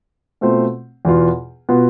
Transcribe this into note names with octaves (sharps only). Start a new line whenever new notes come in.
B2 A3 C4 F4 C5
E2 B2 B3 F4
B2 B3 F4